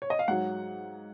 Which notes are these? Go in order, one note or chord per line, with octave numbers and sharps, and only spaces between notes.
C#5
D#5
F5
G#2 F#3 F#5